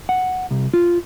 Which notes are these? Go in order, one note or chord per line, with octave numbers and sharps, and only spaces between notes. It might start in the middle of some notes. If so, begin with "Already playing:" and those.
F#5
C2
F4